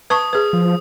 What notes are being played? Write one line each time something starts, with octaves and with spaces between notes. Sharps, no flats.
B4 A5 C#6 D#6
G#4 B4
F3